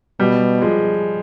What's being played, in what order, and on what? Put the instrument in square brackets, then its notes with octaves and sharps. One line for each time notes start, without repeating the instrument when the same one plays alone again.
[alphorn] B2 [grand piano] G3
[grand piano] F3 G#3